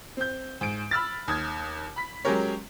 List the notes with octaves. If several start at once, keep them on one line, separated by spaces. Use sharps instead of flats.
C4 G6
G#2 D7
B5 E6 F6 A6
D#2 D#6 G#6
B5 B6
F#3 G#3 C#4 G4 A#4 C#5